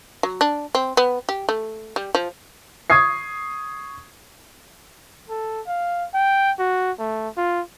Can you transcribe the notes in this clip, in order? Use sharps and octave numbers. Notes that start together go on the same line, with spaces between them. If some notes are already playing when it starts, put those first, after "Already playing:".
F#3
D4
C4
B3
G4
A3
G3
F3
C#6 D#6 G#6 C7
A4
F5
G5
F#4
A3
F4